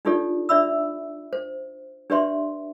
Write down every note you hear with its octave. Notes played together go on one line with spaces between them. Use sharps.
D4 D#4 F4 G4 A4 D5
D4 D5 E5 B5 E6
C5
D4 G4 B4 D5 E5 C6